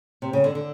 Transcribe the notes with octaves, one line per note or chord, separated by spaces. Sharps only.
C3
C#3
D3
D3